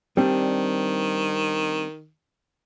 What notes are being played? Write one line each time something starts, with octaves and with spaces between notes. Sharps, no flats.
D#3 G3 C4 D4